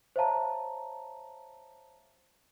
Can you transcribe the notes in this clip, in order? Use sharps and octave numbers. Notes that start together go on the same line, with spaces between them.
C5 C#5 E5 F5 A5 A#5